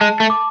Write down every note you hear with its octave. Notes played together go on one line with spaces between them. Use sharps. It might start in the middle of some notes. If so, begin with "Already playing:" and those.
G#3 A5
A3
D6